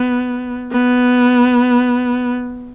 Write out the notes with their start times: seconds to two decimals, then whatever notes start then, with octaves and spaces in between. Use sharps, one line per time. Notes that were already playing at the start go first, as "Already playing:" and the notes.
Already playing: B3
0.72 B3